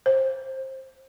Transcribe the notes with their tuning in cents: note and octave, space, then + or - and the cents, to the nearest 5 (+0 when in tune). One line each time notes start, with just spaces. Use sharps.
C5 +25